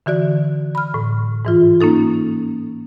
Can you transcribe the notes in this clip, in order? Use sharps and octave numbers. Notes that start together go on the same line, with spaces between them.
D3 E3 F#4 D5
B5 F6
A2
G#2 E3 F4
A#3 C#4 D#4 A4